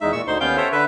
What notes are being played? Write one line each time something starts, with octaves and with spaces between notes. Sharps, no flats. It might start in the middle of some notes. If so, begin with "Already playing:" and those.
E2 G#3 D#4 E5
A#2 C#6 E6
D2 D3 D#4 C5 C6
D#2 B3 C#4 F5 G5 G6
A4 C5 C#5 E5
D3 B4 E5